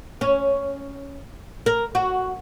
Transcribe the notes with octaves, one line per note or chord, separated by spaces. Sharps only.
C#4
A#4
F#4